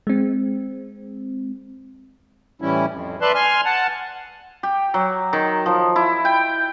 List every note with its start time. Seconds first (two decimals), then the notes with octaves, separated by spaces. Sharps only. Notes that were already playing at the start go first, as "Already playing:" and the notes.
0.07 G#3 C4
2.62 A2 E3 G3 C#4 E4
2.90 F2
3.21 B4 D5 E5 A5 C6 F#6
3.35 G#5 C6 F6
3.65 F#5 A5
4.63 G4
4.94 F#3
5.33 D#3
5.66 F3
5.96 E4
6.25 G5